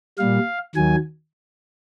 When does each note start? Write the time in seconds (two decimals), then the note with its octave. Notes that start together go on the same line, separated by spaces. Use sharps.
0.18 A#2 G3 F5
0.76 D#2 D#3 F#3 G#5